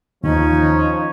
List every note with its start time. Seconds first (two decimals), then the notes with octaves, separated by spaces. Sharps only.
0.24 D#2 F3 C#4 D#4